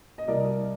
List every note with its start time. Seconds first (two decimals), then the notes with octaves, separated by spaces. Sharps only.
0.18 D#5
0.28 C2 A#4 D5